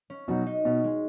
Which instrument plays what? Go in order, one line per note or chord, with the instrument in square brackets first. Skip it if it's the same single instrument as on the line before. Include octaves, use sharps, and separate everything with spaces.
[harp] C#4
[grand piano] B2 F#3 D#4 [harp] F#4
[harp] D#4
[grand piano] B2 [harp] C#4
[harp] G#3